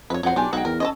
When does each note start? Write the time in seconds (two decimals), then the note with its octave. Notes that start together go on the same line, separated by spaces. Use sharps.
0.10 F2 B4 C#5
0.23 F2 F#3 C5 C#5 F#5
0.36 B1 D4 F4 G4 G#5
0.53 B1 G#3 D#4 F#4 D#5 F#5 G5
0.65 E2 A#4
0.80 C#4 A4 C5 D#5